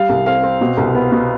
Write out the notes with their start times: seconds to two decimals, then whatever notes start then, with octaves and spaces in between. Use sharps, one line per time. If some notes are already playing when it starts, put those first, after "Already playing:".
Already playing: G3 F5
0.09 C2
0.26 C4 F5
0.43 C4
0.61 B2
0.77 C2
0.95 B3
1.12 B2